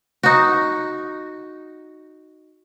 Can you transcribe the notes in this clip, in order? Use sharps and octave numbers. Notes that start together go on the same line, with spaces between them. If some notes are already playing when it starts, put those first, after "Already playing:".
D#4 F#4